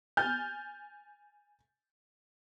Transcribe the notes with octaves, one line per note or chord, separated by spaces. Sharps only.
G#5 F6 G6 A6